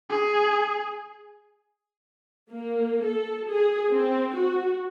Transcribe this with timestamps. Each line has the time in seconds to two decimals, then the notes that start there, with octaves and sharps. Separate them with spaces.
0.10 G#4
2.50 A#3
3.05 A4
3.50 G#4
3.91 C4
4.34 F#4